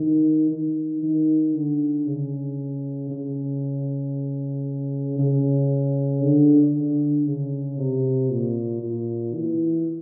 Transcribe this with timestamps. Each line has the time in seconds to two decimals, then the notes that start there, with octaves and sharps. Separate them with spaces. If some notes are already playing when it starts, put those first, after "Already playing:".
Already playing: D#3
0.51 D#3
1.03 D#3
1.55 D3
2.07 C#3
3.11 C#3
5.19 C#3
6.22 D3
6.75 D3
7.26 C#3
7.78 C3
8.30 A#2
8.82 A#2
9.34 E3